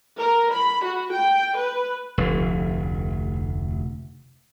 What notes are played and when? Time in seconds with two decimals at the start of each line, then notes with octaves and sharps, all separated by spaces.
0.18 A#4
0.53 B5
0.85 F#4
1.14 G5
1.57 B4
2.18 F1 D2